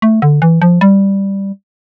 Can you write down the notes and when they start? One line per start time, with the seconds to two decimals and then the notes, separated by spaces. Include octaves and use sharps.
0.02 A3
0.22 D3
0.42 E3
0.62 F3
0.81 G3